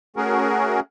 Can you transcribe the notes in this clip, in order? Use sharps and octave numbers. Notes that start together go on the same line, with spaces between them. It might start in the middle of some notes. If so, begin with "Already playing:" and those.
A3 C#4 F#4 G#4 A#4